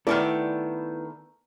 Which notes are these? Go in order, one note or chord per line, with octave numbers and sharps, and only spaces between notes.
D#3 A3 B3 E4 A4 D5